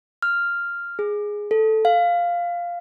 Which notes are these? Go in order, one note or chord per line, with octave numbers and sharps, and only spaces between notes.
F6
G#4
A4
F5